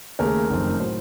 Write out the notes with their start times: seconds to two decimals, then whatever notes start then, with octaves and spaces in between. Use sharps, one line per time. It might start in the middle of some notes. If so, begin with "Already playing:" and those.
0.19 D#2 C#3 A3 A#4
0.50 F#1 F2 D#3 A3 C4
0.80 A2 F#3 C5